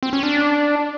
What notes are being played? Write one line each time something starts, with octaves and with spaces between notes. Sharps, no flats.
C4
C#4
D4